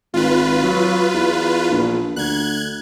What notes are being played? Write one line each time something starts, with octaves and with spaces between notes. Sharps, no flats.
G#1 F4 B4
F#3
E2
A#1
D2 F#6 G#6